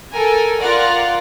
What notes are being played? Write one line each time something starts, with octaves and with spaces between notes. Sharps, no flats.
A4 A#4 G#5
F4 A#4 D5 F#5